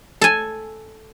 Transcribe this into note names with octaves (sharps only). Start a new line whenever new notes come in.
A4 G#5